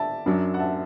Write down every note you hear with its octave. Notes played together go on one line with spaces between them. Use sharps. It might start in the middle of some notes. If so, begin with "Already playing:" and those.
Already playing: D5 E5 A5
F#2 F#3 D4
F#5
E5 A5